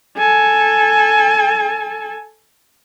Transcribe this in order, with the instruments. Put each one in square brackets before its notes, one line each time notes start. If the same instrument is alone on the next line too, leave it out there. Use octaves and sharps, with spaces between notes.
[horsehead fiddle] A4 G#5